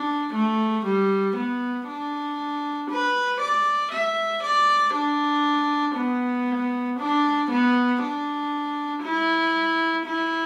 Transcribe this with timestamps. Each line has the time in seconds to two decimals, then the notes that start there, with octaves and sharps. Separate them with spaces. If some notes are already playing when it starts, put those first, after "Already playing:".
Already playing: D4
0.34 A3
0.84 G3
1.36 B3
1.87 D4
2.90 B4
3.40 D5
3.91 E5
4.42 D5
4.94 D4
5.97 B3
6.99 D4
7.50 B3
8.01 D4
9.03 E4
10.05 E4